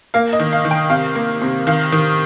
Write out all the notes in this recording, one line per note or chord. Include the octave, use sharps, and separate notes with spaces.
A#3 F5
D#5
D#3
F5
D#3
G5
C3 F5
A#3
C3
D#3 F5
D#3